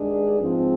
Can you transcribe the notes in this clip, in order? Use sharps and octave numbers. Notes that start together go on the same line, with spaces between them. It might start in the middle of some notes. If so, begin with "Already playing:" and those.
Already playing: G2 D#3 G#3 D4 G#4
G#2 F3 C4